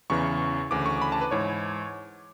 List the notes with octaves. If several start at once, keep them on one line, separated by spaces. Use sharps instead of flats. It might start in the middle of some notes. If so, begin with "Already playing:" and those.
E2 C#3 E3 C#6
D2 C#3 E3 D6
C#6
B5
A5
B4
G#2 E3 C#5